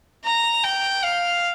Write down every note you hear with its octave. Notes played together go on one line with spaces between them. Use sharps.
A#5
G5
F5